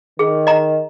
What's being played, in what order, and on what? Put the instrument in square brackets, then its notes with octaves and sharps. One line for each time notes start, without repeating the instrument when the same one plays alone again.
[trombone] D#3 [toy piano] G#4
[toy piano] D#5 A#5